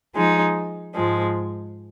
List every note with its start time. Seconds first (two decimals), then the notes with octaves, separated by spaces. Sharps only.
0.13 F3 G#3 D#4
0.95 G#2 F3 G#3